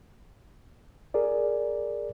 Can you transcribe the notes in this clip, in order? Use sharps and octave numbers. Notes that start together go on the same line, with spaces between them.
G#4 A#4 D5